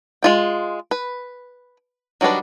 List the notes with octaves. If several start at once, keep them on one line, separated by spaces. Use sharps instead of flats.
G#3 F4 G5
B4
D#3 F#3 G3 D4 B4